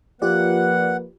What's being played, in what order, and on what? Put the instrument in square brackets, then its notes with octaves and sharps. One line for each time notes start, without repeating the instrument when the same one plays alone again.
[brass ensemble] F3 A#3 B4 [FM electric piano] F4 G4 D5 [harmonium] F#5